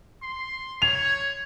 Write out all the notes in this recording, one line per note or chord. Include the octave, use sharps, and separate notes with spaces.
C6
C#5 F7